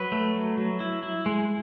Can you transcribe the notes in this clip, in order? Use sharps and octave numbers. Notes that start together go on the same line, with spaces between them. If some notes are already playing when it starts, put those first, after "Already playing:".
Already playing: F#3 B4
A3
F#3
F#3
E4
E4
G#3